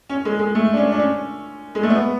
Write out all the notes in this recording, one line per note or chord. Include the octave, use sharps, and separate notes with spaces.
C#4
G#3
G#3
A3
D4
C#4
D4
C#4
G#3
A3
B3